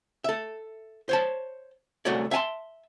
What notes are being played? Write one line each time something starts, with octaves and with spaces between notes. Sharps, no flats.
A4 E5
C5 C#5 A5
C2 A3 F#4 C#5 D5
E5 F5 G#5 A5 C6